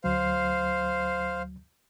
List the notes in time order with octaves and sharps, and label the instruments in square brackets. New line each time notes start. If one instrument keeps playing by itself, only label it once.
[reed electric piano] D2 F#3 [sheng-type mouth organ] C5 F5